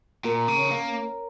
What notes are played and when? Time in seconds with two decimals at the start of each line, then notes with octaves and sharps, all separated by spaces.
0.24 A#2 A#4
0.48 C#3
0.56 C#4
0.71 A#3